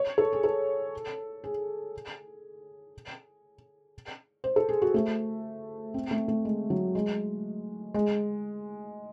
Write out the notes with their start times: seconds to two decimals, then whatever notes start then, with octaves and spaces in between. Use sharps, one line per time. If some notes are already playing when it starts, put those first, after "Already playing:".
Already playing: C#5
0.18 A4
0.33 G#4
0.44 A4
1.44 G#4
4.44 C5
4.56 A4
4.69 G#4
4.82 F#4
4.94 A3
5.94 C4
6.11 A3
6.28 A3
6.45 G#3
6.70 F#3
6.95 G#3
7.94 G#3